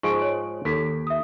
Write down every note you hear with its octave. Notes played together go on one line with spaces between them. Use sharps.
G#2 F3 G#3 C#6 D7
C#5
D#2 A4 B6
E5 D#6